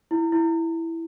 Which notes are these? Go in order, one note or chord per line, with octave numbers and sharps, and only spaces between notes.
E4
E4